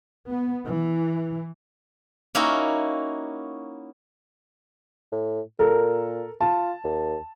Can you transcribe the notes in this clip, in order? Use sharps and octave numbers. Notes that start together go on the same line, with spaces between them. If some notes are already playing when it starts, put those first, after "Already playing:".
B3
E3
A#3 C#4 D#4 E4 F#4
A2
A#2 A4 A#4
F4 A5
D#2